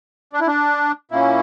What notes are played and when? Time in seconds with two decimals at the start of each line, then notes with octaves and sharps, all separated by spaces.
0.33 D4
0.40 E4
0.47 D4
1.11 A#2 A#3 C#4 E4